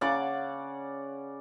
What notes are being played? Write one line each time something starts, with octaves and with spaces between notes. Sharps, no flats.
C#3 D5 F#5 D6